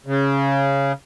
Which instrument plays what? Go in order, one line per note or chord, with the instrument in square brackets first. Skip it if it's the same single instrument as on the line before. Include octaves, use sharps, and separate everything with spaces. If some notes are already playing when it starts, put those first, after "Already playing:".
[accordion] C#3